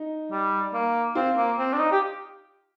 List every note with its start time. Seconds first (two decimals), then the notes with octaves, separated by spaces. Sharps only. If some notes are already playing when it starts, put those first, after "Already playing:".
Already playing: D#4
0.32 G3
0.74 A#3
1.15 C4 F4
1.37 A#3
1.58 C4
1.73 D4
1.79 D#4
1.92 G4